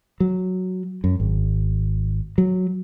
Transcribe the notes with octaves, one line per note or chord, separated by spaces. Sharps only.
F#3
F#2
G#1
F#3